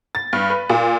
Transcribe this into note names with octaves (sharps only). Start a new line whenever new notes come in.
A6
G2
B4
A#2